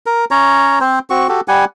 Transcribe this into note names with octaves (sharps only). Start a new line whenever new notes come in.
A#4
C#4 C#5 A#5
C4 C5
C4 F#4 C#6
F#4 G4 A4
G3 G4 F#5 G#5